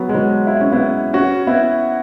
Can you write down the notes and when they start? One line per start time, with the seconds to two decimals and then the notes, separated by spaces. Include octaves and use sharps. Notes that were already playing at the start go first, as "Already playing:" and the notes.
Already playing: F#3 B3
0.09 G#3
0.14 F#3 B3
0.47 E4
0.60 C#4
0.72 B3 E4
1.14 C#4 F#4
1.47 B3 E4